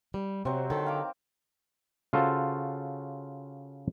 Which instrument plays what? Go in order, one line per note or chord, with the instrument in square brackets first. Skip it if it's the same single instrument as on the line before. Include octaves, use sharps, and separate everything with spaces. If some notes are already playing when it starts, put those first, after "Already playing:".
[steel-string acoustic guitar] G3
[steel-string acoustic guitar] C3 [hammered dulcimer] F#3 C4
[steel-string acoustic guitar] D3 A4 [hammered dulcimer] D#3
[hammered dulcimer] F5 D6
[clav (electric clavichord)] C#3 F4 F#4 A4 C5